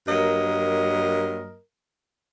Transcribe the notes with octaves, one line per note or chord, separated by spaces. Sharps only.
G2 F#3 A#3 A#4 D#5